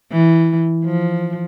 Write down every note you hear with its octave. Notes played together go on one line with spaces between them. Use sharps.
E3
F3